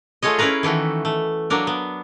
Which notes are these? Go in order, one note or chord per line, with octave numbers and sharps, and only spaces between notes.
A3 F4 G#4 C#5 D#5
C#4 E4 A#4 B4 A#5
D#3 E3 A3 F#4
A3
F#3 A#3 D4 A#4
B3